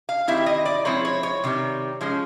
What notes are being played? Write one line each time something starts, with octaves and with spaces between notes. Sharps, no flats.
F5
D#3 G3 C4 E4 E5
D#5
D5
F3 G#3 C4 E4 C#5
C#5
C#5
C3 D#3 G3
F3 G#3 C#4